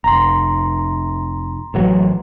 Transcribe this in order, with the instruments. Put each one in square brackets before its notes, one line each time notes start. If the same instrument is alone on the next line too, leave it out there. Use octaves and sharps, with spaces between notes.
[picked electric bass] F1 [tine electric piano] A#5 C6
[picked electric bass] A1 E3 F#3